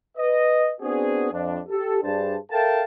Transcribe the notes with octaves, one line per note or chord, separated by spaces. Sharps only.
B4 D#5
B3 C4 D4 F#4 G#4
F2 D4
G4 A4
G2 D4 G#4 C5 A5
A4 A#4 E5 F5 G5 A5